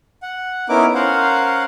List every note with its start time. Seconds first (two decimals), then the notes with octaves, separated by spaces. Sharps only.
0.23 F#5
0.69 B3 C#4 D#4 E4 A#4 D6
0.94 C#4 A#4 C5 F5 F#5